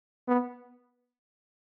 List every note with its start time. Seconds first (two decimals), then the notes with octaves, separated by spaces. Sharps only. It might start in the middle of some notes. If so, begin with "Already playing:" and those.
0.28 B3